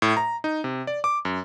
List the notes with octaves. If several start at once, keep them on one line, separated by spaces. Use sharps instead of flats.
A2
A#5
D#4
C3
D5
D6
F#2